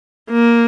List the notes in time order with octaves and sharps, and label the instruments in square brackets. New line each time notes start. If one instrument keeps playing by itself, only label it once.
[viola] A#3